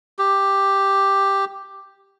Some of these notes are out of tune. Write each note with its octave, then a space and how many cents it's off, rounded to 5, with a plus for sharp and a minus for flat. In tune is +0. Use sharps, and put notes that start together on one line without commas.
G4 +5